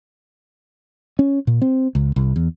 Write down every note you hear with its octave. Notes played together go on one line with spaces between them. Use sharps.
C#4
A#2
C4
C#2
C2
E2